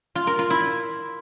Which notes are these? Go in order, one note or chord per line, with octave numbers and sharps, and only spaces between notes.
F4
A#4
F4
E4